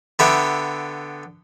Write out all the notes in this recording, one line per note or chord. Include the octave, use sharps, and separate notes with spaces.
D3 B3 G4 E5 B5